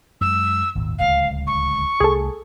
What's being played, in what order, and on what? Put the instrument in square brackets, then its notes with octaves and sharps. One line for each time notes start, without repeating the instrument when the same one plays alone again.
[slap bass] F#2 G#3 [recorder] E6
[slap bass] G#1 D#2 A#2
[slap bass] D1 C#2 [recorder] F5
[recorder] C#6
[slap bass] C2 A3 [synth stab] G#4 A4